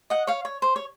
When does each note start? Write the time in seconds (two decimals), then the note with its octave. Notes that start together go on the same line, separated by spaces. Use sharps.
0.10 D#5 F#5
0.27 C#5 F5
0.45 C#5
0.62 C5
0.76 C#5